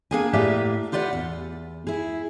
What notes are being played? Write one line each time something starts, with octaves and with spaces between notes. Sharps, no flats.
A#3 D4 G#4 G5 G#5
A2 A#3 G4 B4 D5 E5
F4 G4 B4 D5 F5 F#5
E2
E4 G#4